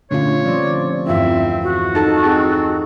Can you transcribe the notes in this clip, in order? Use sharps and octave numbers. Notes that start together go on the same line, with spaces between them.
A#2 D3 A3 C#4 D4 F4 C#5
F3 G3 C4 D5
E2 G2 C4 E4 F4 A#4 E5
F#4
D#4 A4 A5
C4 G#4